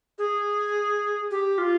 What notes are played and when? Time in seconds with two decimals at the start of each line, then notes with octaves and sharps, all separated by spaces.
0.19 G#4
1.31 G4
1.58 F4